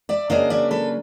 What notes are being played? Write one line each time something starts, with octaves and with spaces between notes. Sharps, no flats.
D5 E5
C#3 F#3 A#3 D4 D#5 F5
D5 E5
A4 B4